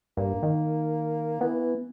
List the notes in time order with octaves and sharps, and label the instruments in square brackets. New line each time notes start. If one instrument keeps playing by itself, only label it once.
[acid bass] G2 [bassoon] A#3
[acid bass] D#3
[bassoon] E3 [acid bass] B3